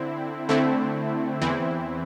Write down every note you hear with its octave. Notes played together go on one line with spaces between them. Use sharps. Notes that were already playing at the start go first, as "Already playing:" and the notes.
Already playing: D3 C4 E4
D3 A3 C4 E4
E2 E3 C4 E4